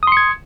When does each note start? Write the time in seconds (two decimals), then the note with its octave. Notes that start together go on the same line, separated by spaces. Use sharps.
0.03 D#6
0.07 C6
0.12 C#7
0.17 G#6